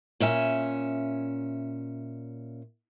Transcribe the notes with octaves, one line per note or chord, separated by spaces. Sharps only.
A#2 C#4 E5 G#5